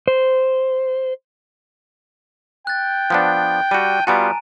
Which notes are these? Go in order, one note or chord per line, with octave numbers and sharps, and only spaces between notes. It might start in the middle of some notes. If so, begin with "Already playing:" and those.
C5
G5 F#6 A6
F3 B3 D4
G3 F#4 A5 D#7
G3 B3 F4 F#4 G#5 A#5 D7